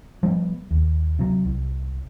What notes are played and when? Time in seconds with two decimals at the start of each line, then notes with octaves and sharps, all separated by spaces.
0.23 F3 G3 A#3 B3
0.71 D#2
1.19 C3 F#3
1.45 C2